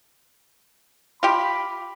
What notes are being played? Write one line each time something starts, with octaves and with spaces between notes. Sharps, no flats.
F4 G4 B5